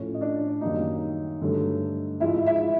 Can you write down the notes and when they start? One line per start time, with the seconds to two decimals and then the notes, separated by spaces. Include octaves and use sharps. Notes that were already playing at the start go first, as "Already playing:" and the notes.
Already playing: A2 F3 A3 C#4 C#5
0.14 D#5
0.21 D4 D5
0.61 F#2 D#3 G3 A#3 D#4 D#5
1.42 G2 D3 F#3 A3
2.20 G#2 F3 G#3 E4 E5
2.46 E4 E5